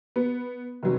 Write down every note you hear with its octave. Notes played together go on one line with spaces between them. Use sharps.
B3
F1 F#3